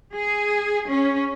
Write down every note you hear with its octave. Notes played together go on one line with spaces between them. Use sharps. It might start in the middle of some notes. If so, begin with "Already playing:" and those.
G#4
C#4